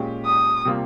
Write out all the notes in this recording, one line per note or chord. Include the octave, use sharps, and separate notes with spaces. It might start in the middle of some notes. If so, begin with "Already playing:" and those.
Already playing: A#2 G#3 C#4 G4
D#6
C3 G3 A#3 F4